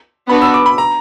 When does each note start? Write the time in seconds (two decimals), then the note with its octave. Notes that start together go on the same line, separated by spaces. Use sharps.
0.29 B3 D4 F#4 B4 B5
0.42 E6
0.54 D6
0.66 B5
0.78 A#5